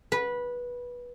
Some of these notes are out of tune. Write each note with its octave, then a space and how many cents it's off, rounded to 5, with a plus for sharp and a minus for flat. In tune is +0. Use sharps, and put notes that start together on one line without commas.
B4 -15